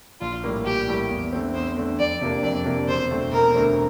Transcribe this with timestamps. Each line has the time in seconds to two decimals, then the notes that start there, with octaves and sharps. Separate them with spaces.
0.21 A#1 F4
0.44 A2 G3 A#3
0.66 A#1 G4
0.88 A2 G3 A#3
1.10 E2
1.32 D3 A3 C4
1.54 E2 C5
1.77 D3 A3 C4
1.99 F2 D5
2.21 C3 F3 A#3 D4
2.43 F2 D5
2.65 C3 F3 A#3 D4
2.88 E1 C5
3.10 D2 D3 A3 C4
3.32 E1 A#4
3.55 D2 D3 A3 C4